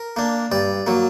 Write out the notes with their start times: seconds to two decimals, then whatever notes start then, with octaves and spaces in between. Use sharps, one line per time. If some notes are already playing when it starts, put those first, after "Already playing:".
Already playing: A#4
0.16 A#3 D4
0.52 G2 D5
0.87 F#3 A#3